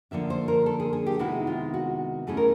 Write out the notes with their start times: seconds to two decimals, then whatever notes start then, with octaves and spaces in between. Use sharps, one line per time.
0.11 D3 F3 A#3 D4 E5
0.30 C5
0.48 A#4
0.66 A4
0.80 G#4
0.93 G#4
1.06 G4
1.19 C3 D#3 G#3 B3 E4 F#4
1.47 F4
1.74 F#4
2.27 E3 A3 C#4 E4 G#4
2.37 A#4